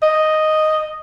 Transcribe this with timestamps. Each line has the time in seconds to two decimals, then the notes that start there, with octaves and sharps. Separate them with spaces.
0.02 D#5